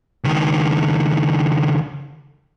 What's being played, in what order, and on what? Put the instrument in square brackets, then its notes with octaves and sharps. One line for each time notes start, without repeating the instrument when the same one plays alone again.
[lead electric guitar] C#2 D#3